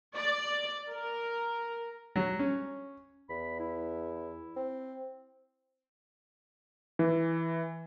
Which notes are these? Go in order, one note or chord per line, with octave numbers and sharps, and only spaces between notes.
D5
A#4
F#3
C#4
E2 B5
E4
C4
E3